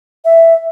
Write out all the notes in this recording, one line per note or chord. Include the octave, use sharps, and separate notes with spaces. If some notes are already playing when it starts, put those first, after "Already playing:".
E5